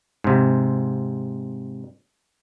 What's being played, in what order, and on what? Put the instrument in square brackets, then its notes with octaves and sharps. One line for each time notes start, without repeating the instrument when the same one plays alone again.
[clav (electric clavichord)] G#2 C3